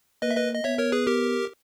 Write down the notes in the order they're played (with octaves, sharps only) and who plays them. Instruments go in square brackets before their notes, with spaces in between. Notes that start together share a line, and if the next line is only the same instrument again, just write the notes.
[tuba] A#3 [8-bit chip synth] B4 D#5
[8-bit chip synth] E5
B4 D#5
D#5
[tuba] B3 [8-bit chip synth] C#5 E5
[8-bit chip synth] A#4 C#5
G#4 B4
G4 A#4